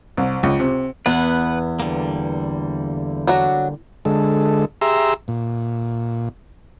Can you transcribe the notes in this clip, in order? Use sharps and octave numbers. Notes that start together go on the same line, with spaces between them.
C2
C#2
C3
E2 B3 B4 F#5
D3 G3 A#3
F#3 D4 F#4
D3 G#3 A4
G4 G#4 E5 A#5 C6 E6
A#2